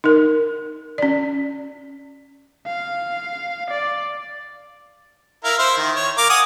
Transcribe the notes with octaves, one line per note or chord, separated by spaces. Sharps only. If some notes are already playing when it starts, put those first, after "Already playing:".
D#4 A#4
C#4 D5
F5
D5
E4 A#4 F5
E4 C5
D#3
C#5
A#4 F5 D6
F#5 G#5 D#6